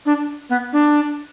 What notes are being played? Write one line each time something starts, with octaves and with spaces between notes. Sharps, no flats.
D4
B3
D4